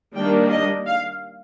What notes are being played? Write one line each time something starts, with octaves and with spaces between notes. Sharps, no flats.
D#3 G3 A#3 D4 G5
D#5
F5